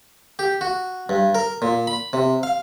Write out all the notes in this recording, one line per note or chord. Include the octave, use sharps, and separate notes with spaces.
G4
F#4
G2
A#4
A#2
B5
C3
F5